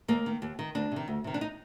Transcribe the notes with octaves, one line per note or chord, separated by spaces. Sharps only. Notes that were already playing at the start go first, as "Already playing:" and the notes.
D#2 A#3
D#3
D#2
D#3
D2 D4
C3 D#3
D2
C3 D#3
D4
D#4